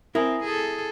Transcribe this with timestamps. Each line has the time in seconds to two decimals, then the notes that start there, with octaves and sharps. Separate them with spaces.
0.15 C4 E4 A#4 G#5 D#6 A#6
0.44 G#4 A4